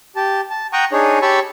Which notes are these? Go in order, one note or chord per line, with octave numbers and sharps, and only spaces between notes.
G4 A5
A5
F#5 G5 A#5 C#6 D#6
D4 D#4 G#4 C#5
G4 C#5 A5 B5 C#6 E6